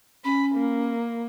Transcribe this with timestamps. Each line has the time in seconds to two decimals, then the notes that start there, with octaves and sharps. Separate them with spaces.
0.24 C#4 B5
0.55 A#3